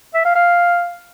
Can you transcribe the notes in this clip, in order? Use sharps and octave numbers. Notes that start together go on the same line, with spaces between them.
E5
F5
F5